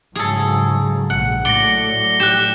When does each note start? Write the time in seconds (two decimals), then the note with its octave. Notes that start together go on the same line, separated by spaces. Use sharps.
0.16 G#2 C#3 F#3 G#4 A4
1.10 A#1 F#5
1.45 A2 F#3 A3 D5 A#6 C#7 G7
2.20 G4 F#6 E7